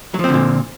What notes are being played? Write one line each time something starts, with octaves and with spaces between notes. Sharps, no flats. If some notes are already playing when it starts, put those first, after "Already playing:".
A#2 D3 F3 F#3 C4